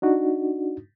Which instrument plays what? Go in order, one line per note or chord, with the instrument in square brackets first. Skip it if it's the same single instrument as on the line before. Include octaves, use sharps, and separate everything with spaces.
[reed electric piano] D4 D#4 F#4